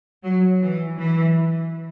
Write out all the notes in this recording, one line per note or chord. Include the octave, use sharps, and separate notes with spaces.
F#3
E3
E3